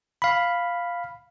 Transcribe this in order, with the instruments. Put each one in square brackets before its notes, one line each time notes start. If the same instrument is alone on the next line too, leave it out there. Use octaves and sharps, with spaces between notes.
[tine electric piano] F5 B5